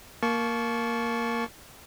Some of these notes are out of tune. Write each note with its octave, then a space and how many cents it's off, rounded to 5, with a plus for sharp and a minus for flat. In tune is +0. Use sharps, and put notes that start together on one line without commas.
A#3 +0 A5 -25 C#6 +0